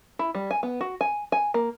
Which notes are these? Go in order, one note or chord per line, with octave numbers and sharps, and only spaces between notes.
E4
G3
G#5
B3
F#4
G#5
G#5
A#3